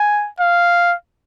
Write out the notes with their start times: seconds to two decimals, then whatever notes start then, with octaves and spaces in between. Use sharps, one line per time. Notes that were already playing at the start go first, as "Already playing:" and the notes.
Already playing: G#5
0.40 F5